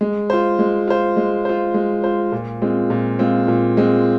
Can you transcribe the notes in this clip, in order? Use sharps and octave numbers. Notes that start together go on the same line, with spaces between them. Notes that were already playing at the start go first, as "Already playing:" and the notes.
G#3
F4 C5
G#3
F4 C5
G#3
F4 C5
G#3
F4 C5
A#2
G#3 C4 F4
A#2
G#3 C4 F4
A#2
G#3 C4 F4